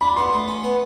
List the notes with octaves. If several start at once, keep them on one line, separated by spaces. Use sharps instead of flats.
D4 B5
B3 C6
A3
C#4
B3